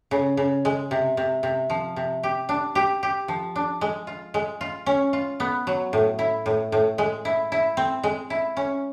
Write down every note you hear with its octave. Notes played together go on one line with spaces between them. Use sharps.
C#3
C#3
G#3
C3
C3
C3
F3
C3
G4
D4
G4
G4
F3
D4
G#3
F4
G#3
F4
C#4
F4
B3
F#3
A2
E4
A2
A2
G#3
E4
E4
C4
G#3
E4
C#4